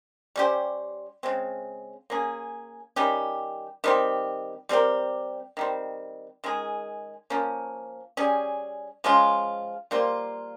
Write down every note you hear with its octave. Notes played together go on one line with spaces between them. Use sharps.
G3 C#4 G4 C5
C#3 G#3 C4
A#3 C#4 G#4
D#3 G3 C#4 G4
D#3 G3 C4 G4
G3 C4 G4 A#4
D#3 G3 C4
D#3 G#3 C#4 G#4
F3 A#3 C#4
G3 C#4 G#4
F3 G#3 C#4 F4
G3 A#3 F4 C5